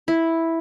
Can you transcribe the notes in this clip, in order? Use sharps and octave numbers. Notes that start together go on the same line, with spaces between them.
E4